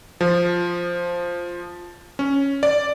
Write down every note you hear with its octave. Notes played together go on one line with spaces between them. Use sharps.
F3
C#4
D5